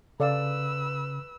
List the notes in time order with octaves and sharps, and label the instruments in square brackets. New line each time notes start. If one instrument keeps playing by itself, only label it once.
[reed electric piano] C#3 [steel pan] A4 D5 F5 [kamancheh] B4 E6